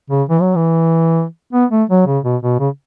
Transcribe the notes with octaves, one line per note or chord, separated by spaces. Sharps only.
C#3
E3
F#3
E3
B3
A3
F#3
C#3
B2
B2
C#3